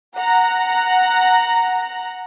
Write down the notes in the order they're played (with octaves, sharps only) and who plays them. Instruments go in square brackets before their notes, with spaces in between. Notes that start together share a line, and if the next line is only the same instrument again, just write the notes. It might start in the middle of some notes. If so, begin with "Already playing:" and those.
[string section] F#5 A#5